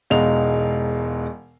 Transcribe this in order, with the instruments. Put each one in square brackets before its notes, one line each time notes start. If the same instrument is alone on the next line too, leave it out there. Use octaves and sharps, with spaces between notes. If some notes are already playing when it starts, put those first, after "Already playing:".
[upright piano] E1 B2 G#3 D#4 F5 F7